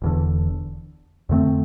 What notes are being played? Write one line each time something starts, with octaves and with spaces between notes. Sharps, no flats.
E1 E2 D3
F2 D3 A3 C4